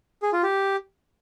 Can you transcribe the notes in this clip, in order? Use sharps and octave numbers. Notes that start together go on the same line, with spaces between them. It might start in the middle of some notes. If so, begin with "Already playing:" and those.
G#4
F4
G4